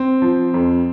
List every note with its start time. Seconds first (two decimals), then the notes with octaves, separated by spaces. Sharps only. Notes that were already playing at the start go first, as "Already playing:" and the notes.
Already playing: C4
0.22 F3
0.54 F2